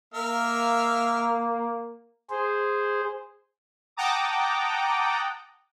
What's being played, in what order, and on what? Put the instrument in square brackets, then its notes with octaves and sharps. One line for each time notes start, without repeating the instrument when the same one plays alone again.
[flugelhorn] A#3 [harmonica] A#4 E5 F5
[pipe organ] G#4 C5
[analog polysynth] F#5 G5 A5 A#5 D6 D#6